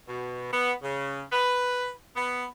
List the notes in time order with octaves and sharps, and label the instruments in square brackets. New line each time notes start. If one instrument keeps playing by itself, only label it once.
[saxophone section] B2
B3
C#3
B4
B3